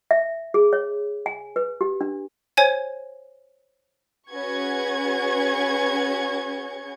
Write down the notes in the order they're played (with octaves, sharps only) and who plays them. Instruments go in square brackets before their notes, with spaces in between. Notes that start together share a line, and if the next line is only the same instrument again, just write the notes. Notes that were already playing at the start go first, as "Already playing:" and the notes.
[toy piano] E5
G#4
C#5
G#5
B4
G4
D4
[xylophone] C5 C#5 G#5 G#6
[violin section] C#4 F#4 G#4 B4 C#6 G#6